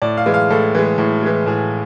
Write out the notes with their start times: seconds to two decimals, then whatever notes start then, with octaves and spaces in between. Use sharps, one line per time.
0.02 A2 D5
0.17 F5
0.26 E3 G#3
0.34 F5
0.50 A2 A4
0.75 E3 G#3
0.98 A2
1.23 E3 G#3
1.46 A2 G#4